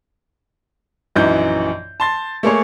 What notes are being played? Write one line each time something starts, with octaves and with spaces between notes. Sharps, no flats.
A#1 F#2 E3 D#4 G6
A5 C6 A6
A3 A#3 G#4 C#5